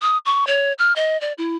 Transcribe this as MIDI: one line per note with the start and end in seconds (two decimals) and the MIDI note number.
0.02 0.18 87
0.26 0.47 85
0.47 0.73 73
0.79 0.93 89
0.96 1.19 75
1.21 1.33 74
1.38 1.57 64